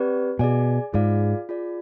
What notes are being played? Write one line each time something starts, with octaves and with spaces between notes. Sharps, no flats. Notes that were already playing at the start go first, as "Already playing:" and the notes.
Already playing: C4 G4 B4 D5
B2 G#4 D5 G#5
G#2 F4 G#4 D5 F5
F4 G#4 D5